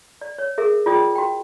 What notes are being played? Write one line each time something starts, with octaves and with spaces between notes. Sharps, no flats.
D5
C#5
G#4 A#4 E5
F4 G#4 D5 G5 D#6
F#4 G5